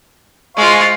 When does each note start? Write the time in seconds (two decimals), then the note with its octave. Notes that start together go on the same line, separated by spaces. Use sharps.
0.57 G#3 F4 C5 F5 C#6